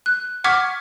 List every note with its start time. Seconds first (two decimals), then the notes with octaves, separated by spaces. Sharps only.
0.06 F#6
0.44 F#5 C#6 D6 F6 G#6 B6